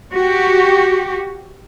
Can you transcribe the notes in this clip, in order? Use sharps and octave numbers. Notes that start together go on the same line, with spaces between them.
F#4 G4